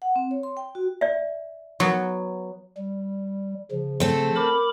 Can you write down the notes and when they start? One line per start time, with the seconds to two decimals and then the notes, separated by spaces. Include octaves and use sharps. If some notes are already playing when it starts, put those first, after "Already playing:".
0.02 F#5
0.16 C4
0.31 C#5
0.43 C6
0.57 G5
0.75 F#4
1.01 D5 E5
1.80 F#3 B3 C#6
2.77 G3
3.71 C#3 F3
4.00 A3 C4 A4
4.36 A#4 B5 D6